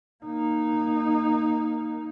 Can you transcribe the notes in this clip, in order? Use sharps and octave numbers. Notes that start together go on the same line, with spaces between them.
A#3 D#4